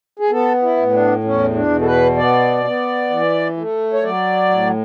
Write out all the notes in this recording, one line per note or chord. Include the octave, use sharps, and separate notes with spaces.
G#4
B3 A4
E4
A2
D4
E2 C#4
D4
B2
A4
B4
B3 D5
B3
E3
A3
C#5
F#3 D5
A2